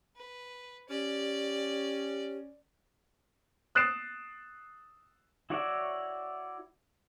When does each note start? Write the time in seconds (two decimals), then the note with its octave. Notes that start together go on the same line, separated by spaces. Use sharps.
0.17 B4
0.89 C#4 G4 D5
3.75 D#6 F#6 A6 C7 D7 E7
5.50 E4 F#4 C#5 D5 E5